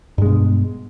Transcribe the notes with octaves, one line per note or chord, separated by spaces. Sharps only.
G2 B2 G#3